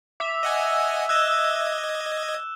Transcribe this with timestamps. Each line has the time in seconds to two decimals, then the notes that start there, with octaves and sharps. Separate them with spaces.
0.20 E5 D6
0.43 D#5 F#5 G#5
1.09 D#5 E6 F#6 G#6 E7